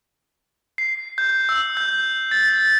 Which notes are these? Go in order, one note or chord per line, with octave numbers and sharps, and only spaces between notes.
C7
G6
E6
G6
A6